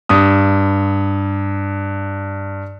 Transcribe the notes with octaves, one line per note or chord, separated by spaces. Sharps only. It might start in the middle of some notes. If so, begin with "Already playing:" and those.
G2 D#6